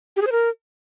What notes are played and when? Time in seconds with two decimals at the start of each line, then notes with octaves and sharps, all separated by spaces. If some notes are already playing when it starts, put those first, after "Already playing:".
0.16 G4
0.22 G#4
0.27 C5
0.32 A#4